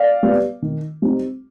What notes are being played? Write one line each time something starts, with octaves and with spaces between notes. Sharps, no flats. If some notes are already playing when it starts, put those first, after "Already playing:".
Already playing: D5 F5
G3 B3
D#3
G3 C4 D#4